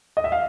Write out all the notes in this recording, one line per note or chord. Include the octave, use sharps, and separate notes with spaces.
D#5
E5
F5